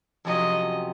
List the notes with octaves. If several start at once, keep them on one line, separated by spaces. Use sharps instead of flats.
F2 C3 F#3 C#4 D#5